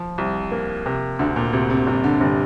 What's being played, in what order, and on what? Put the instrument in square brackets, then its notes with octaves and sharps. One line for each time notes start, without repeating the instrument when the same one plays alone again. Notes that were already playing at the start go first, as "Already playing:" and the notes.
Already playing: [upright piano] F3
[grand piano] C2
A#3
C3
[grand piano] D2 [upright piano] D3
[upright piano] A#2
[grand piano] D2 [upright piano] C3
[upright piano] C3
[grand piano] G1 [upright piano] C3
[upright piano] D3
[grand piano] G1 [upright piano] C3